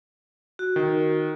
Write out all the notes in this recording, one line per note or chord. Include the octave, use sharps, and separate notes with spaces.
F#4
D#3